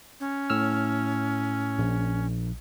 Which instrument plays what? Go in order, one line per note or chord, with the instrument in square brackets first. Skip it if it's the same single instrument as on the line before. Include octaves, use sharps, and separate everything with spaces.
[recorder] C#4
[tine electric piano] A2 E6 F6
A#1